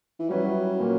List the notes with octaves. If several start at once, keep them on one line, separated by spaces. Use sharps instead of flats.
E3
F#3 G3 C#4 E4 B4
A#2 A#3 C#4